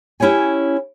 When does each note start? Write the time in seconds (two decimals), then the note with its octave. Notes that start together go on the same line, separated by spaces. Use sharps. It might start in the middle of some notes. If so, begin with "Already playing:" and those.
0.20 C#4 E4 G4 C#5 G#5